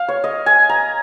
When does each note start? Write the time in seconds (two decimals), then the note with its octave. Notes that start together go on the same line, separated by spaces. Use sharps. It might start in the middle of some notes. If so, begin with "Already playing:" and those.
Already playing: F5
0.08 C#5
0.24 D#5
0.46 G#5
0.69 A#5